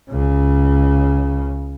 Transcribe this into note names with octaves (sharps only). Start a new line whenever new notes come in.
C#2 C#3